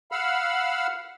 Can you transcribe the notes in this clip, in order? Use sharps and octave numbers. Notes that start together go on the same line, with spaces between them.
F5 F#5 B5 E6 F6